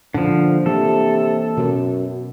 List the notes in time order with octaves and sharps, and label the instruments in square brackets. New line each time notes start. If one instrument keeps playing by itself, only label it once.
[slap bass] A#2 [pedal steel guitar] D3 F3
[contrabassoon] C3 [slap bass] E3 A#3 D4 [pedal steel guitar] A4
[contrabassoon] F#2 [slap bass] B2